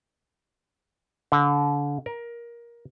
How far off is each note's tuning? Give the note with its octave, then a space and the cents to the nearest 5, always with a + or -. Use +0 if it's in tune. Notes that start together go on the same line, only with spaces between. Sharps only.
D3 -30
A#4 +15